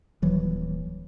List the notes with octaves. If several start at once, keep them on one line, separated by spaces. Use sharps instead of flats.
D#1 E3 F#3